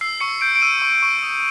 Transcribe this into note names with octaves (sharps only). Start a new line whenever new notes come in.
E6 C7
C#6 C#7
G6 D7
D7
E6 D#7
C#6
C#6
D#6